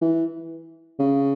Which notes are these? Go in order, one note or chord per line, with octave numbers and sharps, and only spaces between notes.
E3
C#3